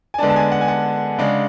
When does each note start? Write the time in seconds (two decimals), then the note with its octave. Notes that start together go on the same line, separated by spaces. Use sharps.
0.14 G#5
0.18 D3 G#3 B3 D4 A5
0.30 A5
0.36 G#5
0.52 F#5
0.61 G#5
0.68 F#5
1.19 C#3 G#3 D4